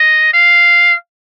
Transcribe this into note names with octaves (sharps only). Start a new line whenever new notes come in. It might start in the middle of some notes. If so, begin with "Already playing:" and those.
Already playing: D#5
F5